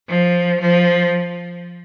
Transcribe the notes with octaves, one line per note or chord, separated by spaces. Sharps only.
F3
F3